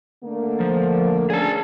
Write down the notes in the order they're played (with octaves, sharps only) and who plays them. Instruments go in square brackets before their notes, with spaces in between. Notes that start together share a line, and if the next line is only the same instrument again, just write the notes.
[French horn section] D3 A3 A#3
[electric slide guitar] F3
[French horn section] C#4 D4 [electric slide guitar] G#4 A5